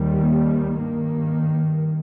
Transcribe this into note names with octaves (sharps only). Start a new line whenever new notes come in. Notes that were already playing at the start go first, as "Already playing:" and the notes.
Already playing: D#2 D#3 G3
A#3
G2 D#3 A#3